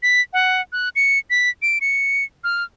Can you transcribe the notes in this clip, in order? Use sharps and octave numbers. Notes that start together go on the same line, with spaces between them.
B6
F#5
F#6
C#7
B6
D7
C#7
F6